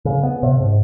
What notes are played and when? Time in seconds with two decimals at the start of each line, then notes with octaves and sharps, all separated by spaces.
0.05 C#3
0.23 B3
0.43 C3
0.60 G#2